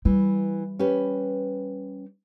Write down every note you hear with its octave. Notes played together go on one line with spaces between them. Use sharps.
E3 G3
C#4 G4 B4